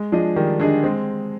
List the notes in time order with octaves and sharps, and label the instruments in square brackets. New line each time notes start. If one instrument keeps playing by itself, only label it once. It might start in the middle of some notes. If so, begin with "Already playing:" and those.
Already playing: [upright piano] G#3
[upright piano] F3 [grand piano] D4 G#4 D#5
[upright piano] D#3 [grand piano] G3
[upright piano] D3 [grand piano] D4 G#4 D#5
[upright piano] G#3 [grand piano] C4